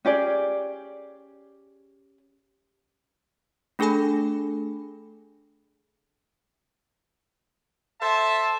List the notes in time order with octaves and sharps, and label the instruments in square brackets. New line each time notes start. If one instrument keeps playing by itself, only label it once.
[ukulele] C#4 G4 G#4 D5
[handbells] A3 D4 G#4 A4 G#5 B5
[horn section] A4 C5 E5 A5